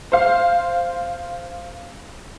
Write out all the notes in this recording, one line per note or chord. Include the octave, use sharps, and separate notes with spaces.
C5 F5